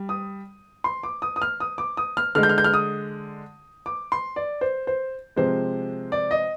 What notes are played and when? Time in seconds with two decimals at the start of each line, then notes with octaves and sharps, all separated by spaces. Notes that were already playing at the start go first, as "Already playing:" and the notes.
Already playing: G3
0.09 D#6
0.84 C6
1.03 D6
1.22 D#6
1.36 D#6
1.42 F6
1.60 D#6
1.78 D6
1.97 D#6
2.17 F6
2.35 D3 G#3 F6
2.43 G6
2.49 F6
2.58 G6
2.64 F6
2.74 D#6
3.86 D6
4.12 C6
4.36 D5
4.61 C5
4.87 C5
5.36 C3 F3 G#3 C5
6.12 D5
6.31 D#5